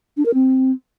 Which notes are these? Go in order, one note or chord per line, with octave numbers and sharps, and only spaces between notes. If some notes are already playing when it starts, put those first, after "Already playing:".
D4
A#4
C4